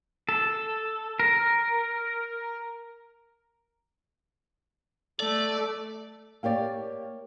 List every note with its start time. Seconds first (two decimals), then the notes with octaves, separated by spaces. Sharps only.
0.29 A4
1.20 A#4
5.20 A3 D5
6.43 A#3 G4 C#5 D5